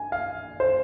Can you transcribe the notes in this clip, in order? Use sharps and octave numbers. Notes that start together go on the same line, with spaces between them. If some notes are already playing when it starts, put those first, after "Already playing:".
Already playing: G#5
F5
C5